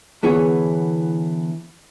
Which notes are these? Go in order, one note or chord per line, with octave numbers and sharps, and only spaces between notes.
D3 E3 B3 G#4 C#5